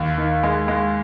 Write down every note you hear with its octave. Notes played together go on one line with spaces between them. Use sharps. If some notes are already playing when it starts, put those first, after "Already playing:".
Already playing: D#2
D#3
G#3
G#3